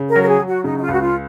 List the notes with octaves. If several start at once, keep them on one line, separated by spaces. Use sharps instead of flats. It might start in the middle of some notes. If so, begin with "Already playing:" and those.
Already playing: C#3
A#4
F#3
A#4
G#4
F#3
F#4
C#3 D#4
D#4
F4
C#2 F#4
F4